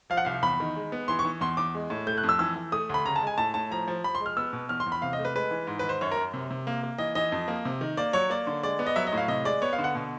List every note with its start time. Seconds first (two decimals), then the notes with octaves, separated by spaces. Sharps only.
0.10 F3 F5
0.17 F#5
0.25 C2 F5
0.42 E2 B5
0.60 D#3
0.76 G#3
0.92 B3
1.08 E3 C6
1.19 C#6
1.25 E3
1.41 E2 C6
1.57 E2 D6
1.75 G#3
1.90 A2
2.07 A3 G6
2.18 F#6
2.23 F2
2.29 E6
2.39 E3 E6
2.56 E3
2.72 A3 D#6
2.89 D2 B5
3.05 C#3 A#5
3.16 A5
3.22 G#3 G#5
3.38 A2 A5
3.54 A2 A5
3.71 F3 A#5
3.88 F3
4.04 F3 B5
4.15 C6
4.20 G#3
4.26 F6
4.37 B3 E6
4.53 B2
4.69 E2 F6
4.80 C6
4.86 E2
4.92 B5
5.02 C3 F5
5.13 D#5
5.19 A3
5.25 B4
5.35 G#3 B4
5.51 E3
5.67 G#2
5.79 D#3 B4
5.89 C5
6.01 F#2 C#5
6.11 A#4
6.16 F#2
6.34 C3
6.50 C3
6.67 A#3
6.83 A#3
6.98 E3 D#5
7.15 E3 D#5
7.32 F2
7.48 A#3
7.65 C3
7.81 D#3
7.97 A#3 D5
8.13 F#3 C#5
8.30 A#3 D5
8.47 D3
8.63 G#3 D5
8.79 B3
8.87 D#5
8.96 F#3 E5
9.07 D#5
9.13 A2 F5
9.28 C3 D#5
9.45 G#3 D5
9.62 B3 C#5
9.73 F5
9.79 D3
9.84 F#5
9.95 B2